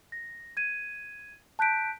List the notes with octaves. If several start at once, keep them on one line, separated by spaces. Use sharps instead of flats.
A#6
G#6 D#7
A5 F#6 G6 B6 D7